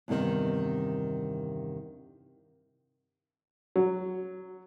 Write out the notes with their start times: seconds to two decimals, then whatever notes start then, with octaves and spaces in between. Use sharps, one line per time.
0.08 E2 G2 C3 D#3
3.76 F#3